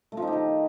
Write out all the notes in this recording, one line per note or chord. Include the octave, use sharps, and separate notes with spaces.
A3
F3
D#4
G4
D#3